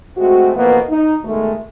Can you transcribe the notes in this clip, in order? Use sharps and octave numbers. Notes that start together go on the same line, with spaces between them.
G#3 A3 C4 F#4
F2 B2 E3 A#3 B3
D#4
B2 D#3 G#3 A3